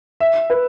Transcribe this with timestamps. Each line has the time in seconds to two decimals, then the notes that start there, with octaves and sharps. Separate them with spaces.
0.20 E5
0.50 B4